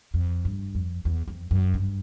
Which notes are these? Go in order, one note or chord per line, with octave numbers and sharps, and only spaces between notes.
F2
G2
F2
E2
F2
F#2
G2